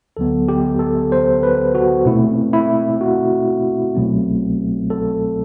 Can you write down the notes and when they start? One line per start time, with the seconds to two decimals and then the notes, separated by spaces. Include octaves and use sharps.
0.17 D2 D3 F#3 B3 A4
0.48 G4
0.79 A4
1.12 C5
1.43 B4
1.75 F#4
2.06 B2 A3 C4 E4
2.53 E4
3.01 F#4
3.95 C2 B2 F#3 A3 C4
4.90 A4